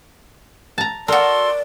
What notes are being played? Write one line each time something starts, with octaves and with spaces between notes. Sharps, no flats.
A5 A#5
F#4 A4 A#4 D5 C6